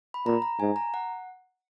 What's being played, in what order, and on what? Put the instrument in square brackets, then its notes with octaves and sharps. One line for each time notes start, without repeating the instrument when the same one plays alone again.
[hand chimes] B5
[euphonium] A#2 [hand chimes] A#5
[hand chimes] A#5
[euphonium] G#2 [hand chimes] G#5
[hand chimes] A#5
F#5